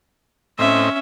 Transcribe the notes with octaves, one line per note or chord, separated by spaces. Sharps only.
A2 C4 C#4 D#5 E5